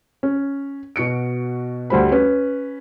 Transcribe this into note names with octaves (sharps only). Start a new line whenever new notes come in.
C#4
B2 F#4 C#7 D7
D2 G3 C5 B5
C#4 B4